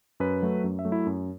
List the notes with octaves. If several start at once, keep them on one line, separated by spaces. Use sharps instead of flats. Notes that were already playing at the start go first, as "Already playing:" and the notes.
F#2 B4
F#3 A3
F#2
E5
F#3 A3
E4
F#2